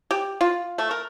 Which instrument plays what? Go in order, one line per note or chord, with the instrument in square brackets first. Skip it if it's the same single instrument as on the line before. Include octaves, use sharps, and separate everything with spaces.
[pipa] G4
F4
A3
A#4